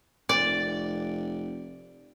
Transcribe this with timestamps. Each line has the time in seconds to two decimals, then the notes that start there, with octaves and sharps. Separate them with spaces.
0.29 F1 D5